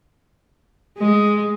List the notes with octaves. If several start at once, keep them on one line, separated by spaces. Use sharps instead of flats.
G#3